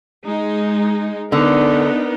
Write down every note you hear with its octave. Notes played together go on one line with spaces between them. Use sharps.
G#3 D#4
D3 B3 D#4 A#4